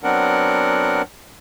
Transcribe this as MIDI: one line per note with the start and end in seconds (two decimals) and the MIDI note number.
0.04 1.02 54
0.04 1.02 59
0.04 1.02 60
0.04 1.02 62
0.04 1.02 70
0.04 1.02 78